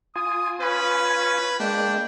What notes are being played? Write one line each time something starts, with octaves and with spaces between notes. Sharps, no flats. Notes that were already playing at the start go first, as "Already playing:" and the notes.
F4 G#5 D#6
C#4 B4
G#3 A#3 D4 G5